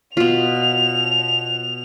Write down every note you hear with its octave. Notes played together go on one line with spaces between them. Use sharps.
B2 F4 F7